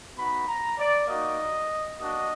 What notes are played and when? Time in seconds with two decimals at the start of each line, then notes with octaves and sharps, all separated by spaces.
0.16 B3 D#4 F#4 B5
0.47 A#5
0.78 D5
1.07 A#3 D#4 F#4 D#5
1.98 A#3 D4 F#4 D#5